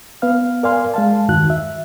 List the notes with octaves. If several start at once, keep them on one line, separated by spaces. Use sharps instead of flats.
B3 B4 F5 F6
A#4 D5 F5 G#5 C6 F6
G#3 F5 A5
E2 G2 D#3 F#4 F#6
E5